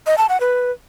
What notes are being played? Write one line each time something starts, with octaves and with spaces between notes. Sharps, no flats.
D#5
A5
F#5
B4